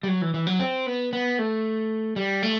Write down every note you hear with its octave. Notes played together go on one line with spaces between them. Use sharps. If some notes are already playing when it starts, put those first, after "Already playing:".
G3
F#3
E3
E3
F#3
C4
B3
B3
A3
G3
A3